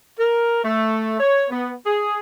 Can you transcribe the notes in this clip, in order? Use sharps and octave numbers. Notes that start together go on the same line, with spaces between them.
A#4
A3
C#5
B3
G#4